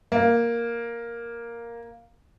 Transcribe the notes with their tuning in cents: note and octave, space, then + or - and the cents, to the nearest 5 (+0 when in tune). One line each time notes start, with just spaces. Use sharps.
A#3 +5